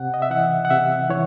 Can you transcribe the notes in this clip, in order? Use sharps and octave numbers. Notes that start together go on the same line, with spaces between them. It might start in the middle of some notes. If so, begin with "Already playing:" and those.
Already playing: C3 F#5
D#5
E5
E3 F#5
F#5
C3 E5
E3 C#5